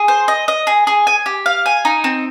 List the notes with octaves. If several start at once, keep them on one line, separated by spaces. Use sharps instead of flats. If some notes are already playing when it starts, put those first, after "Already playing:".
Already playing: G#4
C5
D#5
D#5
G#4
G#4
G#5
G4
F5
G#5
D#4
C4